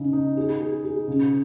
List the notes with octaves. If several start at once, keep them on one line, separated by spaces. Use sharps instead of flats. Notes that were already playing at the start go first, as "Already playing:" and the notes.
Already playing: C#3 D#4
D#4
G#4
G#4
G#4
C#3